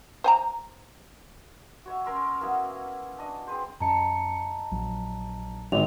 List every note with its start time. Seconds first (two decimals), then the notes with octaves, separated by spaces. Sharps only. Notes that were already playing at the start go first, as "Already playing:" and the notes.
0.24 C5 G#5 A#5
1.86 F#4 C#5 E5
2.04 C#4 A#4 C6 E6
2.41 A#3 B3 E4 F#4
3.18 D4 D#5
3.47 C4 G#4 B4 C5
3.80 F#2 D#5 A5 A#5 C#7
4.71 A#1 F#3
5.72 G#1 D3 F7